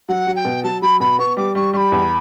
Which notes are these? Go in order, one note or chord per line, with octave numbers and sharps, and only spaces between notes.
F#3 F#5
F#3
G5
B2
F#3 A5
F#3 B5
B2 B5
B3 C#6
G3 D6
G3 C#6
G3 B5 C#6
E2